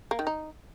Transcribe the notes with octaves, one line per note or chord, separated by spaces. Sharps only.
A#3
D#3
D#4